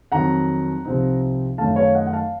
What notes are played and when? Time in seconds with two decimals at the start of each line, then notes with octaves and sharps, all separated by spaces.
0.12 F2 D#3 F#3 F#5 A#5
0.85 C2 C3 F3 C4 D#4
1.58 F#2 D#3 A3 F5 A5
1.76 C#5 F5
1.95 D#5 F#5
2.07 F#5
2.13 F5 A5